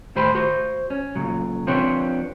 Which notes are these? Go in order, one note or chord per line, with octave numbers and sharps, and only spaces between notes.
D#2 A2 G4 C5 B5
F#4 C5
C#4
B1 A#2 C#3 F#3
F3 C4 D4 G4 B4 C#5